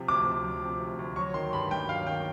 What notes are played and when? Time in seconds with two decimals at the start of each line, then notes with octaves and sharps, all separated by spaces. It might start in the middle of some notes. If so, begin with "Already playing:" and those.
Already playing: C3 F3
0.08 D2 D6
0.26 D2
0.44 F3
0.62 C3
0.80 D2
0.99 D2
1.16 F#3 C#6
1.34 D#3 C6
1.53 G2 B5
1.71 G2 G5
1.89 F#3 F5
2.07 D#3 G5